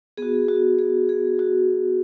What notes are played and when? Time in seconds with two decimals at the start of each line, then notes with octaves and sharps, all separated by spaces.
0.17 B3 F#4 G#4
0.48 F#4
0.79 G#4
1.09 G#4
1.39 F#4